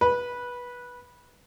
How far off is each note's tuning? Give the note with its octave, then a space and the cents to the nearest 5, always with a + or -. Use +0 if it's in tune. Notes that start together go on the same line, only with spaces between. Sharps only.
B4 -15